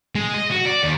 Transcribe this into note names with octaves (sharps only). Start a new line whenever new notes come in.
G#3
D#5
F#4
D5
D#2